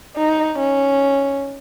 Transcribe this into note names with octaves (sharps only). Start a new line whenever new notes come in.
D#4
C#4